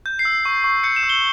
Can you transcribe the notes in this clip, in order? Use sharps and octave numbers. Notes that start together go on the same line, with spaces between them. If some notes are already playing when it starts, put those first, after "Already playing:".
G6
C7
E6
C7
C#6
C#6
G6 C#7
E7
E6
G7